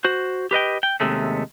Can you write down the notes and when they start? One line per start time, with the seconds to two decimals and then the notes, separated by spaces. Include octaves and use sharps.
0.05 F#4 C5
0.51 G4 B4 D#5 G5
0.83 G5
1.00 D#2 C3 G#3 A3 C#4